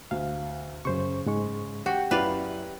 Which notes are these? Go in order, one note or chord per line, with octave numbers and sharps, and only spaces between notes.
D2 F5
F#2 C#3 C5 C#6
G#2 G#3 C#6
F#4 G4 G5
F#2 E4 B4 D5 F5